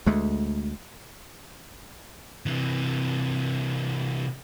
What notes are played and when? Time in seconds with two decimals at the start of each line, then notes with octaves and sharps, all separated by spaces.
0.06 D2 G#3 A3
2.46 C3 E3